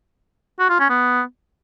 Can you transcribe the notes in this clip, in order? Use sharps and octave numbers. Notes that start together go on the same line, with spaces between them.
F#4
F4
C#4
B3